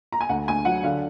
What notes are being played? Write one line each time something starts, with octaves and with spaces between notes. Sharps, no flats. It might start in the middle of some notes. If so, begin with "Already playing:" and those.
A#5
G#5
D2 F#5
D2 G#5
F#3 F#5
D3 F5